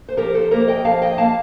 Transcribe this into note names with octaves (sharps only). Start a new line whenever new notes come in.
C5
F3 G4 A#4
A4 C5
A#3 G4 A#4
D#5 G5
F3 F5 A5
D#5 G5
A#3 F5 A5